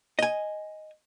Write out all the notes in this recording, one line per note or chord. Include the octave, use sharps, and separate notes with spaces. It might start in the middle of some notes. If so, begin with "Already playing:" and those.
D#5 G#5